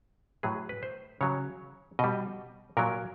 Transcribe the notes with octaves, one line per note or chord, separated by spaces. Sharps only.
A2 F#3 G#4
B4
C5
C#3 F#3 C#5
B2 G3 D#5
A#2 F#3 A#4